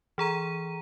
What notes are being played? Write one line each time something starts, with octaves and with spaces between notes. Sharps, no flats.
E3 G#4 A#5 D#7